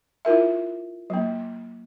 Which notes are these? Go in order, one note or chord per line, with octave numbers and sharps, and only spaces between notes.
E4 F4 A#4 E5
F#3 A#3